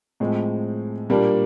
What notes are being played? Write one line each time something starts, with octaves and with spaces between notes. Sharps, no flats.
A2 F3 G#3 C4
A#2 G3 A#3 D4